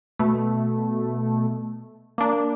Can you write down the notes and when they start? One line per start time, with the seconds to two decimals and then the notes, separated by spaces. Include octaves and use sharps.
0.19 B2 A3
2.18 A#3 D4